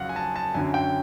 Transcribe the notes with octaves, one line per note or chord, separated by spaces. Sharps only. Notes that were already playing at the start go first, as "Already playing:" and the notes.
Already playing: F2 C#3 F#3 F5 F#5
G#5
A5
A5
F#2 D3 F#3 G#5
G5